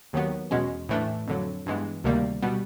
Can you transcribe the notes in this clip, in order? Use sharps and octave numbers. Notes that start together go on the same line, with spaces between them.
D#2 D#3 F#3 B3
E2 B2 G#3 C#4
A2 E3 A3 D4
F2 D3 F#3
G2 E3 G#3 B3
D2 C3 D#3 G3 A#3
B2 G3 B3